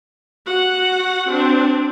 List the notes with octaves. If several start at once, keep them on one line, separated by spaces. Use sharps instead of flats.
F#4 F#5
C4 D4